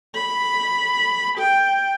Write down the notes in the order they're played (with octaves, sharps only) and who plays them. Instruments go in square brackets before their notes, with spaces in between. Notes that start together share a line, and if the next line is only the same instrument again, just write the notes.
[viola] B5
G5